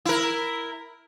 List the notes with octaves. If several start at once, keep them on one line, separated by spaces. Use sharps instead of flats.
E4 A#4